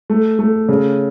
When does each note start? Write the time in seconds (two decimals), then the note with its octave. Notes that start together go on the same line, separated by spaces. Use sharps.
0.10 A3
0.39 A3
0.69 C#3